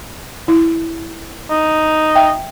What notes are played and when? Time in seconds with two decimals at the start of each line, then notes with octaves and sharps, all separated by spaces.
0.48 E4
1.50 D#4
2.15 E5 G5